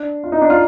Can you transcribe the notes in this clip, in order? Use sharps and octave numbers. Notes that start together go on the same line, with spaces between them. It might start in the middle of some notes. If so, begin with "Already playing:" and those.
Already playing: D4
F4
D#4
D4
F4